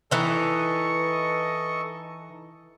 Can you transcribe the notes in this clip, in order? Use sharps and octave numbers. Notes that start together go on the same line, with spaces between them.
E3 D#4 A4 D#5 C#6